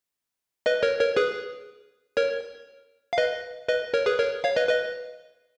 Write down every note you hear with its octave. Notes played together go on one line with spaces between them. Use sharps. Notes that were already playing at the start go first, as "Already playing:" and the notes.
B4 D#5
A#4 C#5
A#4 C#5
G#4 B4
A#4 C#5
F5
B4 D#5
B4 D#5
A#4 C#5
G#4 B4
A#4 C#5
C#5 F5
B4 D#5
B4 D#5